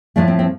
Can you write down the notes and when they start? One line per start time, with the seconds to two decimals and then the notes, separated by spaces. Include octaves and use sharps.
0.16 A2 F3 A3 D4
0.28 C4
0.39 C4